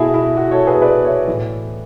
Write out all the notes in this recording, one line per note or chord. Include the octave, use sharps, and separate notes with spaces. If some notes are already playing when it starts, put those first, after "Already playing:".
Already playing: B2 E4 F#4 G#4 A4
E4
F#4
A4 C#5
G#4 B4
B4 D5
C#5 E5
A2 E3